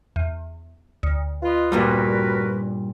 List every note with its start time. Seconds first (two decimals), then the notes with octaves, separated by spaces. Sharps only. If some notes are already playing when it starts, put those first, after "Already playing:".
0.16 E2
1.03 D2
1.43 F4 B4 D#5
1.72 G2 A#2 G3 F#4 A#4 B4